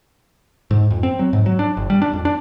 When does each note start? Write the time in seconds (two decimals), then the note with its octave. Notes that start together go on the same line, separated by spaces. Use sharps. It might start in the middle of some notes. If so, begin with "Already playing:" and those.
0.71 G#2
0.91 F2
1.03 C4
1.19 F#3
1.33 G#2
1.46 F#3
1.59 D4
1.77 G1
1.90 G3
2.02 D4
2.13 F2
2.25 D4